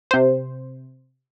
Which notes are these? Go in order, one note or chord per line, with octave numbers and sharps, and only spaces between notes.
C3 C5